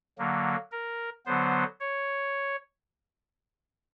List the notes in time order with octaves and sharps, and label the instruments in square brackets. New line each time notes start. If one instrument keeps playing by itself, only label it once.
[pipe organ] D3 F#3 A#3
A#4
D3 F#3 B3 C5
C#5